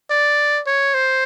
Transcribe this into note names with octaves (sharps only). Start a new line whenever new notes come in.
D5
C#5
C5